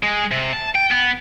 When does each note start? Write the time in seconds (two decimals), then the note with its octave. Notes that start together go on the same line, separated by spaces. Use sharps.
0.03 G#3
0.31 C3
0.53 A5
0.75 G5
0.91 B3